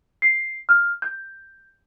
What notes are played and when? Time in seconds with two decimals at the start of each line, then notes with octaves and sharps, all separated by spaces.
0.22 C7
0.69 F6
1.02 G6